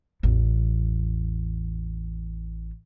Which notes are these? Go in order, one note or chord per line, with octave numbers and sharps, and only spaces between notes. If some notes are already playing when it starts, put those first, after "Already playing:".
A1 E2